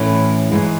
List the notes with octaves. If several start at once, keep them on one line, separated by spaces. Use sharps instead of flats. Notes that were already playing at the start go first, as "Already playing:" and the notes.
Already playing: A2 E3 A3 C#4
G#2 E3 G#3